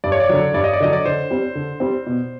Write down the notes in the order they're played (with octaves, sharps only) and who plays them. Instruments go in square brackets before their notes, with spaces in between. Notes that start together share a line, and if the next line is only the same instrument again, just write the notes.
[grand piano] G2 [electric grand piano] D5
[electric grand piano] C#5
D5
[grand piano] D3 F#3
[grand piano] G2 [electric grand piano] D5
[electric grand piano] D#5
D5
[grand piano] D3 F#3 [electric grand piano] D#5
[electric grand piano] D5
[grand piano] D3 [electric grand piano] C5
[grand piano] G3 C4
D3
G3 C4
B2